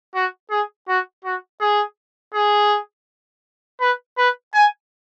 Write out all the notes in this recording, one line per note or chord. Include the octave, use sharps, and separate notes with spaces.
F#4
G#4
F#4
F#4
G#4
G#4
B4
B4
G#5